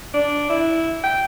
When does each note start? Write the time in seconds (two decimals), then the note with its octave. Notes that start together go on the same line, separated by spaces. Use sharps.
0.14 D4
0.50 E4
1.04 G5